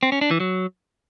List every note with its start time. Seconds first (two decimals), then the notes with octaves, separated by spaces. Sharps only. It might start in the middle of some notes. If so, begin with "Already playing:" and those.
0.03 C4
0.12 C#4
0.21 D4
0.31 E3
0.40 F#3